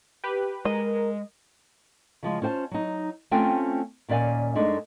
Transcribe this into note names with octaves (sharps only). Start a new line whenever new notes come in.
G4 B4
G#3 A#4 D#5
C#3 F3 G#3
C#4 F4 C5 G5 A5
F#3 D#4
A3 C4 C#4 F4 G5 G#5
D#2 A#2 C#4 D5 F5 G#5
F#2 G#3 A3 D4 D#4